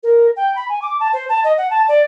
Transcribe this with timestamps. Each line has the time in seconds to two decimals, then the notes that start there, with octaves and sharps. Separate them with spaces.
0.03 A#4
0.36 G5
0.55 B5
0.69 G#5
0.82 D6
1.00 A5
1.13 C5
1.29 A5
1.44 D#5
1.57 F#5
1.70 A5
1.88 D5